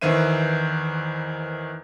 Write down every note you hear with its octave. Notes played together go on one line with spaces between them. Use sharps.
E2 D#3 E3 C5 E5 D#7